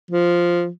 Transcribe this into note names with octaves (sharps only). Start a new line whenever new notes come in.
F3